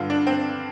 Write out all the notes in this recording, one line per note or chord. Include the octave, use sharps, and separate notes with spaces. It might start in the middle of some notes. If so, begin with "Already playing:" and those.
Already playing: G2 D3 F4
D4
C4